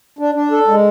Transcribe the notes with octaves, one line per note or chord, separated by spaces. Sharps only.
D4
D4
A4
G#3